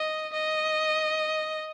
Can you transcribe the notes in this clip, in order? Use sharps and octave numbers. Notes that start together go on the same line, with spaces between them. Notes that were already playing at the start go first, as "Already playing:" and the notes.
Already playing: D#5
D#5